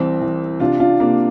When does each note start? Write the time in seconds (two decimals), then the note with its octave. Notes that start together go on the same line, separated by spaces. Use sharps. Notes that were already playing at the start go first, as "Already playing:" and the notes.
Already playing: C2 E3 C4
0.21 E3
0.60 C3 D4 F4
0.80 D4 F4
1.00 C3 A#3 D4